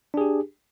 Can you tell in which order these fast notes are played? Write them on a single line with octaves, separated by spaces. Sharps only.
D4 G#4 G4